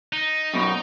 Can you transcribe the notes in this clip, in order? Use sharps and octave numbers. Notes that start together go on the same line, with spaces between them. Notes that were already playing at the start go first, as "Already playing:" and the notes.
D#4
F#2 B2